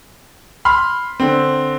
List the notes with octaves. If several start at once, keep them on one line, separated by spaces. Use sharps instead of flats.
B5 C6 F6
D3 C4